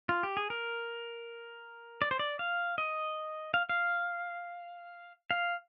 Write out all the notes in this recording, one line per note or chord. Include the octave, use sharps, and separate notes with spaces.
F4
G4
G#4
A#4
D5
C5
D5
F5
D#5
F5
F5
F5